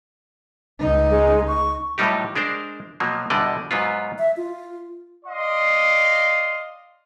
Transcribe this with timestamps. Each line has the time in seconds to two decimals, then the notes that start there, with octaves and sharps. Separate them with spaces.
0.80 C#2 D#4
1.09 G#3
1.47 C#6
1.98 A2 F#3 G3 D#4 G4
2.35 G#3 D4 A#4 C5
3.00 B2 F3 F#3 A#3
3.30 E2 B2 D3 G3 D5 D#5
3.71 G#2 F#3 B3 F4
4.18 E5
4.37 F4
5.26 D5 D#5 F5 C6